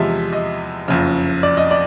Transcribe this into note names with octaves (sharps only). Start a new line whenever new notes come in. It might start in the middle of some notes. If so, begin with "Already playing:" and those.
Already playing: E2 C3 F3 G#3 E5
D#5
F#1 F2 C#3
D5
D#5
D5